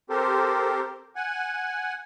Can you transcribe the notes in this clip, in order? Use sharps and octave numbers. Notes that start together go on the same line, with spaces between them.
C4 G4 A4 A#4 C5
F#5 G#5